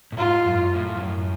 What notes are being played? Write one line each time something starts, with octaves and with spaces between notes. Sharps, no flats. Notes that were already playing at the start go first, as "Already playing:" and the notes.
A2
G#2 F4
F#2
A2
F2
F#2